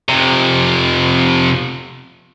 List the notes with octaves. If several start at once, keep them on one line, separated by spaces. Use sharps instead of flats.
F2 C3